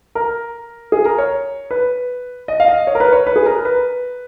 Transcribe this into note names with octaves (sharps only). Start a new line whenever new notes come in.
A#4
G#4
A#4
C#5
B4
D#5
F5
D#5
C#5
A#4
B4
C#5
B4
G#4
A#4
B4